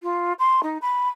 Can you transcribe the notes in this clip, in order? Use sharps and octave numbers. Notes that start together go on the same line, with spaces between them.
F4
C6
D#4
B5